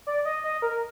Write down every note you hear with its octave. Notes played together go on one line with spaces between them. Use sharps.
D5
D#5
D#5
A#4